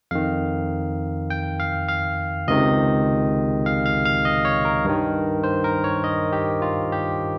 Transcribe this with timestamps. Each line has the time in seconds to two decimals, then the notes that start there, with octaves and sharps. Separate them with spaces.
0.11 F2 D#3 F5
1.30 G5
1.60 F5
1.88 F5
2.48 C#2 C3 D#3 D#5
3.66 F5
3.86 F5
4.06 F5
4.25 D#5
4.45 C#5
4.65 A#4
4.85 G2 D#3
5.44 C5
5.64 A#4
5.84 C#5
6.04 D#5
6.33 G4
6.62 F4
6.92 G4